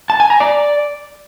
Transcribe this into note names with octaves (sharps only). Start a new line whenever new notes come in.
A5
G#5
A#5
D5